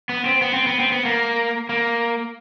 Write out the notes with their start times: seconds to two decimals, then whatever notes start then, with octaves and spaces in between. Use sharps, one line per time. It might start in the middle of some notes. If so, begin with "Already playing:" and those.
0.09 B3
0.26 C4
0.42 B3
0.54 C4
0.67 B3
0.80 C4
0.92 B3
1.05 A#3
1.69 A#3